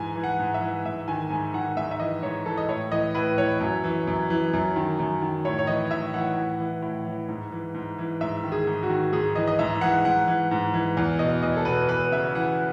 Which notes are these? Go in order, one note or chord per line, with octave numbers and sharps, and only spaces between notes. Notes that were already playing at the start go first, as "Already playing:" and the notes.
Already playing: G#2 E3 G#5
E3
F#5
G#2
E5
E3
G#2 E5
D#3 G#5
G#2 G#5
D#3 F#5
G#2 E5
E5
E3 D#5
G#2 C#5
E3 A4
D#5
A2 C#5
E3 D#5
A2 B4
E3 C#5
F#2
E3
F#2
E3
F#2
D#3
F#2
D#3
A2 C#5
C#5
E3 D#5
A2 E5
E3 F#5
A2
E3
A2
E3
G#2
E3
G#2
E3
G#2 E5
D#3
G#4
G#2
F#4
D#3
G#2 G#4
E3 D#5
D#5
G#2 E5
E3 F#5
G#2 F#5
E3
G#2
E3
E2
B2 D#5
E2 D#5
A4
B2 B4
E2 B4
C#3 E5
E3 F#5